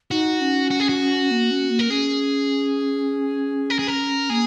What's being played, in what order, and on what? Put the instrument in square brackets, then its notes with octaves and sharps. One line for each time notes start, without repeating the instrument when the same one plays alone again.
[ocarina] D#4 [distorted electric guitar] F#4
[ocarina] C#4
[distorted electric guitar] F#4
G#4
F#4
[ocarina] A#3
C#4
A#3
[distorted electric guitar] A#4
[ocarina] C#4 [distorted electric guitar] G#4
[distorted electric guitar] A#4
G#4
A#4
[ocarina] A#3 [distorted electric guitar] G#4